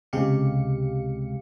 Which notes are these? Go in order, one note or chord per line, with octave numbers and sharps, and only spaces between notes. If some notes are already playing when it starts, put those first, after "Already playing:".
C#2 C3 G#3 G4 F5 C#7